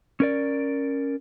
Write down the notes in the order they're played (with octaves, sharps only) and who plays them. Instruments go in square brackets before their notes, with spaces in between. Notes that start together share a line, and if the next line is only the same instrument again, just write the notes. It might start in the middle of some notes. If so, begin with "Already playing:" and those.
[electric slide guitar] C#4 A#4 D5